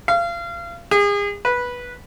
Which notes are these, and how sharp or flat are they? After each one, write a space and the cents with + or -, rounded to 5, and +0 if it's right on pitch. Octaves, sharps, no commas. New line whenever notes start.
F5 -30
G#4 -35
B4 -10